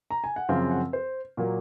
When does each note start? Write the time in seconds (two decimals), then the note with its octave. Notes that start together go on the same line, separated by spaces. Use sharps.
0.11 A#5
0.24 G#5
0.36 F#5
0.49 F#2 C#3 F3 C4 F5
0.71 F#5
0.93 C5
1.37 A#2 F#3 A#3